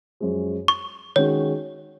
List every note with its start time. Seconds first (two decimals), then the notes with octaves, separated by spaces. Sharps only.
0.20 F#2 F3 G#3
0.68 C#6
1.16 D#3 G#3 C#4 F#4 C#5